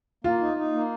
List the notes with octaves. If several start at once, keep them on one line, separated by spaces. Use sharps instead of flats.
A#3 F4
D#4
D#4
A#3